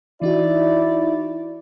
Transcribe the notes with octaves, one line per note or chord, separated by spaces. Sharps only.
E3 D#4 E4 F#4 D5